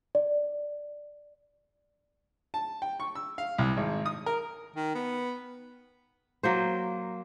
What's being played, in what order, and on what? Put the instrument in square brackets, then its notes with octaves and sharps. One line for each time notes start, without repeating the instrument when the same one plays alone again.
[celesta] D5
[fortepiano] A5
G5
C#6
E6
F5
C2
G#1
D#6
A#4
[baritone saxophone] D#3
B3
[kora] F#3 A#3 C5